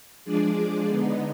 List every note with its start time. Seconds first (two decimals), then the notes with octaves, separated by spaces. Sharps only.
0.25 F3 G#3 D4 G#4 D5
0.86 D3 G#3 B3 D#4